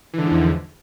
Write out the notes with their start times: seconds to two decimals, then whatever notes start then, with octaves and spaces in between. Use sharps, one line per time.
0.14 E3
0.18 D3
0.22 G#2
0.27 F3
0.31 E2